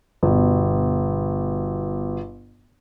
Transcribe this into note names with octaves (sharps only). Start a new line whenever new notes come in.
G1 B2